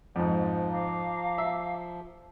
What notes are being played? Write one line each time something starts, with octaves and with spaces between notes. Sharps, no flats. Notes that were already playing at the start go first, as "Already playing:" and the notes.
F2 G#2 F3
F5 A#5 D6
E5